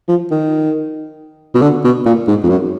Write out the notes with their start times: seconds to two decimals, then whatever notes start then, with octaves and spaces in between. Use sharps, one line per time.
0.08 F3
0.31 D#3
1.54 B2
1.62 D3
1.84 B2
2.06 A#2
2.27 G#2
2.44 F2
2.49 F#2